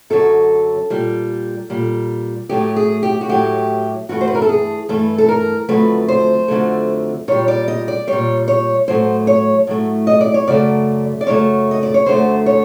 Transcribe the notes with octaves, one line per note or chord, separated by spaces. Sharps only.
F#2 D3 F#3 A4
A#2 G3
A#2 G3
A2 F#3 A3 G4
G#4
G4
F#4
A2 F#3 A3 G4
G2 E3 A3 F#4
C5
B4
A#4
A4
G#4
G2 E3 A3 A4
A4
A#4
F2 D3 F#3 A3 B4
C5
F2 D3 F#3 A3
A#2 G3 C#5
D5
D#5
D5
A#2 G3 C#5
C#5
A2 F#3 A3 C5
C#5
A2 F#3 A3
D#5
D5
C#5
F#2 C#3 F#3 A3 D5
D5
F#2 C#3 F#3 A3 C#5
D#5
D5
C#5
F#2 D3 F#3 A3 C5
C#5